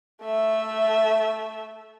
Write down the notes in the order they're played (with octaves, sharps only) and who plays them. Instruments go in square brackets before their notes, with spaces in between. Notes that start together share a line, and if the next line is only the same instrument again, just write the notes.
[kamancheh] A3 E5